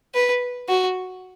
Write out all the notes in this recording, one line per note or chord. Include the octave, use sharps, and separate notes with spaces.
B4
F#4